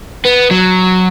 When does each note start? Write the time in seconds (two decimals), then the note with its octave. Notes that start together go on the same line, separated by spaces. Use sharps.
0.25 B3
0.51 F#3